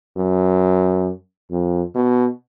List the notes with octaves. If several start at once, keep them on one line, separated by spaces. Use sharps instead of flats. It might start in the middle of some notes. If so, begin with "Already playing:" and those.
F#2
F2
B2